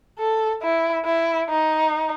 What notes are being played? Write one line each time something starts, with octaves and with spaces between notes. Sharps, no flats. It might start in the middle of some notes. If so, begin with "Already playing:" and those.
A4
E4
E4
D#4